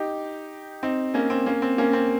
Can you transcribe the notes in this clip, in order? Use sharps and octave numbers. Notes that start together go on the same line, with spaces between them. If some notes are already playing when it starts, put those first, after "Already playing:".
Already playing: D#4 G4
C4 D#4
A#3 C#4
C4
A#3 C#4
C4
A#3 C#4
C4